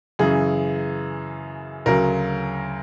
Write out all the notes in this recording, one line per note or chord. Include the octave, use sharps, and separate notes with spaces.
F#2 C#3 E3 G#4
D2 C#3 F#3 A#4